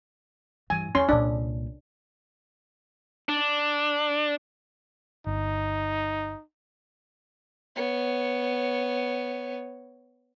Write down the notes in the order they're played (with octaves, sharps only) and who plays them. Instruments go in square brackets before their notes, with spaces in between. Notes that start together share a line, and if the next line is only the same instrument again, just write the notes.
[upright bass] G2 E3 [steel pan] G#5
[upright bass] E2 [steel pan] C#4 C6
[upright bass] C2 A#2 [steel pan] D4
[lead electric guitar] D4
[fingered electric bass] G1 [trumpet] D#4
[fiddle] B3 C#5